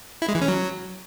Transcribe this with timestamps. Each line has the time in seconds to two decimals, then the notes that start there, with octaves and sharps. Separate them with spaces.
0.22 E4
0.28 G#3
0.35 E3
0.42 C#4
0.48 F#3